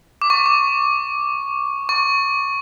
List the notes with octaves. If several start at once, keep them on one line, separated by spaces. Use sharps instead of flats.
D6
C#6
C#6
C#6